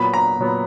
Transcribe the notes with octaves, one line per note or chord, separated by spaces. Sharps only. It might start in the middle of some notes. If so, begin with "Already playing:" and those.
Already playing: A#2 F#3 B3 B5
A#5
A#2 F#3 B3